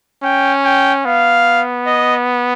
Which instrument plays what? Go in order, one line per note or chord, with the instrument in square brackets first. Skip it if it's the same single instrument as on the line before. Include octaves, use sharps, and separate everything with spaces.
[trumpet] C#4 [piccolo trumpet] G5
[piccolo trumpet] G5
[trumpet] B3 [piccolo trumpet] F5
[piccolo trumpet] D#5